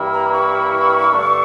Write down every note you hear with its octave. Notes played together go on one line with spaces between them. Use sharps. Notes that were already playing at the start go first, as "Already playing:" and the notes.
Already playing: G2 E3 A#3 E4 G4
A#5
C#6
G2 D3 A3 D4